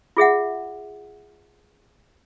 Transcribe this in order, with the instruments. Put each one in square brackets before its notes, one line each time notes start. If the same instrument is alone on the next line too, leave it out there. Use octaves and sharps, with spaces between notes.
[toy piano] F4 G#4 E5 F#5